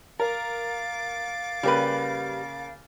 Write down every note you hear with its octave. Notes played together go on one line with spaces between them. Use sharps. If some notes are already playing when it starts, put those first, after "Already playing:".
A#4 F5 D6 A6
C#3 G3 A#3 G4 B4